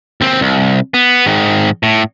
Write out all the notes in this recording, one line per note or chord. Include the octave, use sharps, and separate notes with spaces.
D#2 C4
C2
B3
G#2 D#3
A2